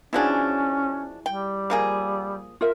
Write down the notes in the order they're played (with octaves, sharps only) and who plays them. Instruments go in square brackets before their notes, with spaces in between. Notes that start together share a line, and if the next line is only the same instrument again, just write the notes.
[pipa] B2 F3 D4 [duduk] C#4 [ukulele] E4 F#4 G#4
[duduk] G3 [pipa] G5
[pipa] F3 A#3 G#4
[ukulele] F4 A#4 E5